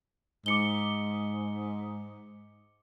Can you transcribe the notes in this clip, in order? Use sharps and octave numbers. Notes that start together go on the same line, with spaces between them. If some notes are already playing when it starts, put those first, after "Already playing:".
G#2 D6 C#7 G7